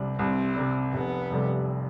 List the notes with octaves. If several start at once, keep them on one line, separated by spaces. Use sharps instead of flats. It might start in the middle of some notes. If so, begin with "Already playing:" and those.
Already playing: C2 C3 G3
C2 C4
C3 G3
F1 B3
F2 C3 G3